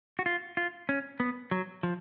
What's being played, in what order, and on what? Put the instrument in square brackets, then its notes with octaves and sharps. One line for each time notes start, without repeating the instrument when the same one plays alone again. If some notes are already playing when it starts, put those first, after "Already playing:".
[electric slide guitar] F#4
F4
F4
C#4
B3
F#3
F3